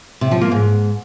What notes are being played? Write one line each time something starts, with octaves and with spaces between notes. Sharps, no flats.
C3
F3
A#3
G#2